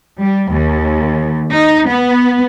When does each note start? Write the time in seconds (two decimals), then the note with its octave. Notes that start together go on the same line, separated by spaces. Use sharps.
0.22 G3
0.53 D#2
1.49 D#4
1.88 B3